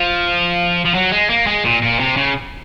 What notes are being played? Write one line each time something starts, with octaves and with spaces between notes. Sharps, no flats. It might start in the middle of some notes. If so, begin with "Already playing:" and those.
Already playing: F3
F3
F#3
G#3
A#3
G#3
A#2
A#2
C3
C#3